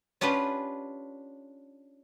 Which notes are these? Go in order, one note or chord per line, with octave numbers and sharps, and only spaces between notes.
C#4 D4 F4 G4 B4